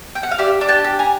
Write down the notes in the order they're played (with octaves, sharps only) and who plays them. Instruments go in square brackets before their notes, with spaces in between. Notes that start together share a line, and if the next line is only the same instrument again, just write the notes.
[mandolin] G5
F#5
F5
G4 D5 E5
D4
G5 A5
G4
G#5 A#5